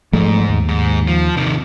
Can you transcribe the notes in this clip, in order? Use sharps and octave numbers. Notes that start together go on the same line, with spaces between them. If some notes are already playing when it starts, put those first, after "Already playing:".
G#2 F3 G#3 A3
D#2
G#2
F3
C3 D#3